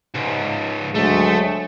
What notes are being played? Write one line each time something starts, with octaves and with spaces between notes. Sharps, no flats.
C#2 G#2
D2 F#3 G#3 A3